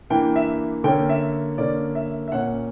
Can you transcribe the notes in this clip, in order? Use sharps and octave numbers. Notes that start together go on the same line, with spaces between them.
E3 A#3 D4 G5
E5
D3 A#3 C#4 G5
E5
D3 A#3 C#4 D5
E5
E5
A#2 A#3 C#4 F#5